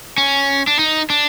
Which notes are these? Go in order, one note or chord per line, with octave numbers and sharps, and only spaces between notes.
C#4
D4
D#4
D4